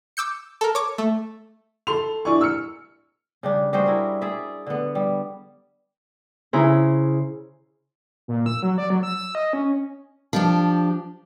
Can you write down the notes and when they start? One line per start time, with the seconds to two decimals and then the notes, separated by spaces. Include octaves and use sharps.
0.17 D6 E6 G6 C#7
0.61 A4 A#4
0.75 C#5 D6
0.98 A3
1.87 A4 C6 F7
2.25 D4 E4 D5 G#5 C#6
2.41 E6 F6 C#7
3.43 C#3 G3 D4
3.73 G3 F#4 G#4 C5
3.86 E4 A#4
4.21 G#4 D5 E5
4.67 D3 B3
4.95 G3
6.53 C#3 E4 C5 G#5 A#5
8.28 A#2
8.46 E6
8.62 F#3
8.78 D5
8.90 F#3
9.03 E6
9.17 E6
9.35 D#5
9.53 C#4
10.33 F3 D4 G4